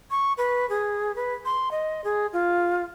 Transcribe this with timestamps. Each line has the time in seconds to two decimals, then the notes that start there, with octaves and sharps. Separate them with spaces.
0.11 C#6
0.38 B4
0.70 G#4
1.16 B4
1.45 C6
1.71 D#5
2.04 G#4
2.33 F4